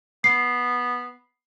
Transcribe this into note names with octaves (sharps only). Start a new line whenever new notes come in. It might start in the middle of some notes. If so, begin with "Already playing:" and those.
B3 C7